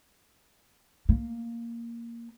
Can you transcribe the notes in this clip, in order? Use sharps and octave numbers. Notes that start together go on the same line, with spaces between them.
A#3